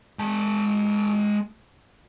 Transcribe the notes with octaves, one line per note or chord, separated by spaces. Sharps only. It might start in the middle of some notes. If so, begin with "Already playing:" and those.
G#3 A5